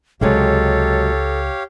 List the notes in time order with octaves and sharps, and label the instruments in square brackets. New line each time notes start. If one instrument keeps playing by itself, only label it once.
[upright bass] C#2 [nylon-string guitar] C3 F#3 G#3 [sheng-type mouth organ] G4 C#5 F5 [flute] A4